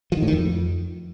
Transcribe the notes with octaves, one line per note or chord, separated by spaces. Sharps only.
F3
D#3
A2
D#3
F2